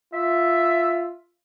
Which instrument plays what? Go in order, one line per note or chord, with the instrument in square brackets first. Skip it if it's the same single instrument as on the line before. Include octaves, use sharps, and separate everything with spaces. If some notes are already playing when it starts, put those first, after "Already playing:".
[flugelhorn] F4 [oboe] E5